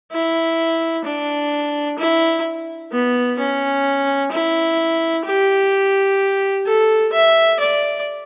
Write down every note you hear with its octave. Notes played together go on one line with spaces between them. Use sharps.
E4
D4
E4
B3
C#4
E4
G4
A4
E5
D5